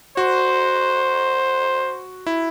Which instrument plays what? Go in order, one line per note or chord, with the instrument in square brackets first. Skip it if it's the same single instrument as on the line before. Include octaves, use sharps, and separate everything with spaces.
[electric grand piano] F#4 [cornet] C5
[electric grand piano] E4